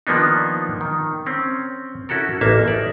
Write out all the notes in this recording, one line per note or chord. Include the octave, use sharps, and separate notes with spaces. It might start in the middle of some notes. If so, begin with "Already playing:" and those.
D#3 F3 A#3 B3 D4 D#4
D#3
C4 C#4
C#4 E4 F#4 A4 A#4
A1 A#3 E5 A5
D#4 D5 E5